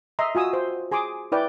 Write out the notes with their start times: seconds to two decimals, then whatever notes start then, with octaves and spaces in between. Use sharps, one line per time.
0.19 D#5 E5 A#5 C6
0.35 F4 F#4 G#5 D#6 E6
0.53 C5
0.91 G#4 G#5 C6 D6 D#6
1.32 E4 B4 D5 G5